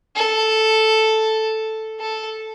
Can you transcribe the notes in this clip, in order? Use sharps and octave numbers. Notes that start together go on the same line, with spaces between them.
A4
A4